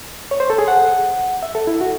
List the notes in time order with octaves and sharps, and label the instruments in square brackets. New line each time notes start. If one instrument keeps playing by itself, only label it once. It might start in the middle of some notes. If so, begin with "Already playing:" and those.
[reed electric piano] C#5
C5
A4
G#4
F#5
E5
A4
E4
F#4